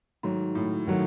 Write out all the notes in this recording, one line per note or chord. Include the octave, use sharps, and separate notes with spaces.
G#2 D#3 F#3 A3
A2
D#3 F#3 A3